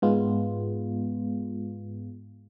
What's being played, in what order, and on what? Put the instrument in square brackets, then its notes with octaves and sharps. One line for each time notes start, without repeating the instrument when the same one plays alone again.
[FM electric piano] G#2 G#3 B3 F4